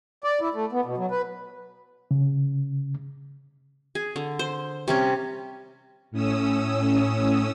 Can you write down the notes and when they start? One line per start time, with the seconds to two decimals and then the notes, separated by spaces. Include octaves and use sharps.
0.24 D5
0.41 E4
0.54 A3
0.72 B3
0.85 B2
0.98 F#3
1.11 B4
2.11 C#3
3.95 G#4
4.16 D3
4.39 C5
4.88 C3 G3 C#4
6.11 A2 C#4 D#6 E6